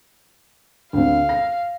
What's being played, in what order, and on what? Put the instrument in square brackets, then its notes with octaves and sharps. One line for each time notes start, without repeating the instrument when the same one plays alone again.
[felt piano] D2 C4 [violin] F5
[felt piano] A#6